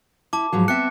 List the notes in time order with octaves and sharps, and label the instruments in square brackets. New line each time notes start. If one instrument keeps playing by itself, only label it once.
[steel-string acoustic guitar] E4 [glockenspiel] A5 D6
[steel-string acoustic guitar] G#2 F3 F#3
[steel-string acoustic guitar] B3 C4 E5 [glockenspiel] F#6 C#7